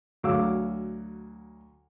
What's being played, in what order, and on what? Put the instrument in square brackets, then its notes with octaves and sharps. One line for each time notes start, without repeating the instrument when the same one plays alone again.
[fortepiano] D2 F#3 F5 D6 E6